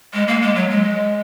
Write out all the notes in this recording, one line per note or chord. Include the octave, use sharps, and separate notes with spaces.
G#3
A#3
G#3
F#3
G#3